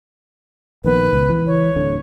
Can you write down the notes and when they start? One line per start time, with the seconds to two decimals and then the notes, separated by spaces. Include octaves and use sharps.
0.84 A#1 D#3 B3 B4
1.13 C#2
1.29 E3
1.47 C#5
1.76 D1 D3